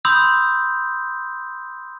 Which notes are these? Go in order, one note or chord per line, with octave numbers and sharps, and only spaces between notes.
B5 C6 D#6 E6 G6